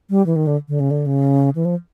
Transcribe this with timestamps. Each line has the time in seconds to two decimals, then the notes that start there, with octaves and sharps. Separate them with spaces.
0.10 G3
0.26 E3
0.36 D#3
0.47 D3
0.68 D3
0.80 C#3
0.91 D3
1.06 C#3
1.55 E3
1.65 F3